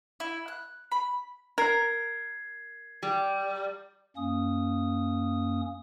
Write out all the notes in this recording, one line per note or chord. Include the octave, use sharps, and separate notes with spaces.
E4
F#6
B5
A#4 G#6 C7
G3
F#2 A#3 C#4 D#6